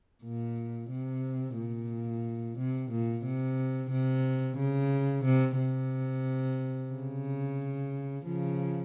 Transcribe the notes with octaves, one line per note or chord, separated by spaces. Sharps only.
A#2
C3
A#2
C3
A#2
C3
C3
C#3
C3
C3
C#3
C#3 F3